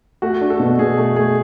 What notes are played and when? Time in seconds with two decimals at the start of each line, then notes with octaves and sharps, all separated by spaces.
0.22 A3 F#4
0.41 D4
0.50 A4
0.60 B2
0.79 B2 G#4
0.98 A3
1.16 A3 G#4